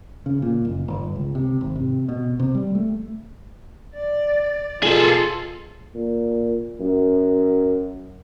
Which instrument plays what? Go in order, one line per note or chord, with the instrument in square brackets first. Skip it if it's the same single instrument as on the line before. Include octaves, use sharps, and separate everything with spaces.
[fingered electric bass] C#3
A#2
F#1
G1
C#2
C3
G#1
C3
B2
C3
G3
A3
[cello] D5
[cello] B2 F4 [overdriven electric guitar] G#4 A4
[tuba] A#2
F#2